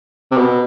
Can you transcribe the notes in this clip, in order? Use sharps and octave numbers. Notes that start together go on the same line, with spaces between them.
C3
B2